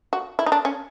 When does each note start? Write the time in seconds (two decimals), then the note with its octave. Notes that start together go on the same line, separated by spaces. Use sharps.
0.13 F#4
0.39 E4
0.46 D#4
0.52 D4
0.65 C#4